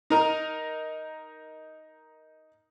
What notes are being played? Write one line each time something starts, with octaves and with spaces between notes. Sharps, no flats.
D#4 A#4 A#5